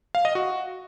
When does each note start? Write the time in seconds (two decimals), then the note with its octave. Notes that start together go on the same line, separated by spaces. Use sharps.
0.15 F5
0.25 D#5
0.35 F#4